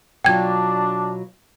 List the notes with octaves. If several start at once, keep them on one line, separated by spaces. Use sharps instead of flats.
B2 F#3 D4 F4 G5 G#6